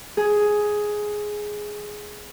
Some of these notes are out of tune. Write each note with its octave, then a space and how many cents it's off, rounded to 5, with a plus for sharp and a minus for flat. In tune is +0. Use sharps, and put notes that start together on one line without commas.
G#4 +5